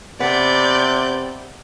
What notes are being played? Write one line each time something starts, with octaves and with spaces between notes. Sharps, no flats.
C3 B3 D5 G6